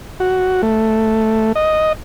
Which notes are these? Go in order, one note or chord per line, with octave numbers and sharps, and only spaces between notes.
F#4
A3
D#5